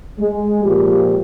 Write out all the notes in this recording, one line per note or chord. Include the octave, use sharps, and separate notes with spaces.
G#3
A#2 F3 G#3 G4